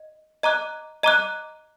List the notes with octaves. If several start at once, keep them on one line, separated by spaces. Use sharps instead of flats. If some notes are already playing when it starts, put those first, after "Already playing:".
Already playing: D#5
D#5 A#5 D6 F#6
D#5 A#5 D6 F#6